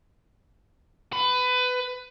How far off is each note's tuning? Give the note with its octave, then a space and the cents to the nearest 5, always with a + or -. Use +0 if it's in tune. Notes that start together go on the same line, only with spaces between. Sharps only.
B4 +20